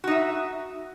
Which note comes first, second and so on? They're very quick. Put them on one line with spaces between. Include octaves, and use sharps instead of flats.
F#4 D#4 E5